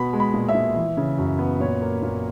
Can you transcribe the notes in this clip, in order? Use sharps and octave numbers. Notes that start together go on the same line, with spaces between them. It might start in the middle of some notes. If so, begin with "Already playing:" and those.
Already playing: B2 B3 B5
G#3
B5
A#2
E5
A#2
E3
C#3
F#2
B3
A#2 C#5
A#3
A#2